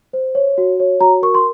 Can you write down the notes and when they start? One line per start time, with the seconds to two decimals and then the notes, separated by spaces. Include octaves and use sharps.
0.13 C5
0.35 C#5
0.58 F#4
0.80 C#5
1.01 F#4 A#5
1.22 A#4 C#6
1.35 C6